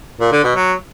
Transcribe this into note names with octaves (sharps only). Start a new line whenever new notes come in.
A#2
D3
B2
F#3